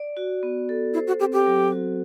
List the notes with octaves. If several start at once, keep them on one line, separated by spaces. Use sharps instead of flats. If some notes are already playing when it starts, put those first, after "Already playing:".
Already playing: D5
F#4
B3
A4
E4 C5
F#4
C4 G4
G4
F#3
F#4